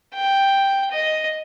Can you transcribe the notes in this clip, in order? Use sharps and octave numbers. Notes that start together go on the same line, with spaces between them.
G5
D#5